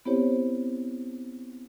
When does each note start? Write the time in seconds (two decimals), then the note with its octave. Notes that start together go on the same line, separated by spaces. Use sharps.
0.05 B3 C4 E4 G4 C5 C#5